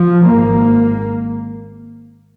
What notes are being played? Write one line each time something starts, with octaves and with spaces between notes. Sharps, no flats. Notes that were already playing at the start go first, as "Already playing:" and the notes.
Already playing: F3
G#1 G#2 A#3